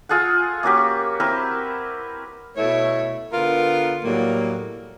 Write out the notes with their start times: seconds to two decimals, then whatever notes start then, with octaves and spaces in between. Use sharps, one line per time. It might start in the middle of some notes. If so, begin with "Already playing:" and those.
0.09 F4 G#4 A4 F#5
0.63 A#3 C#4 F#4 G4
1.20 C4 E4 A#4 B4
2.57 B2 A3 E4 A4 C#5
3.32 D3 B3 F4 A#4
4.04 A2 F#3 G3 A#3